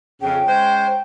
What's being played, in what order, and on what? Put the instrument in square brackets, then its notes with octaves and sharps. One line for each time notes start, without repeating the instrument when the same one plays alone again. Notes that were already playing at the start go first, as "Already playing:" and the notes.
[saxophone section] F2 C#3 [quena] G5
[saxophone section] G#3 C#4 C5